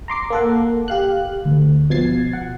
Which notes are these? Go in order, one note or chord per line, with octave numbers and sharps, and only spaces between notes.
A#5 C6 D6 C7
A#3 A4 F#5
G4 F5 F#6
D2
B2 F3 G#6 A6 C7
F#5